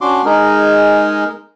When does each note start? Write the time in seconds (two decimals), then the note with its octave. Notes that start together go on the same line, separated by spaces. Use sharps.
0.01 C#4 D4 F#4 C6 D6
0.25 G#3 D#4 G#4 A#4